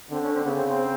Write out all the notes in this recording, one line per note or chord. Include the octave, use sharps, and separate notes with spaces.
D3 C4
C#4
C4
C#3 B3
C4
C4